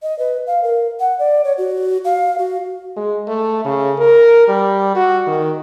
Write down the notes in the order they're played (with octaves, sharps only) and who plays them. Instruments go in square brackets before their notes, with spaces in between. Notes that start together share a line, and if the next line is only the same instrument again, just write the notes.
[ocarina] D#5
B4
F5
A#4
F#5
D5
C#5
F#4
F5
F#4
[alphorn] G#3
A3
C#3
A#4
G3
F#4
D#3